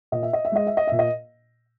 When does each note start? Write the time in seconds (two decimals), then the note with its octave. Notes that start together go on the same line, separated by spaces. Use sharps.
0.12 A#2 D#5
0.23 E5
0.33 D#5
0.45 E5
0.52 G#3 D#5
0.67 E5
0.77 D#5
0.87 A#2 E5
0.99 D#5